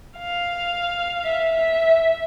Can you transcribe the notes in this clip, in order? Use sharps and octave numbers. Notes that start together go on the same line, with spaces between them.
F5
E5
E5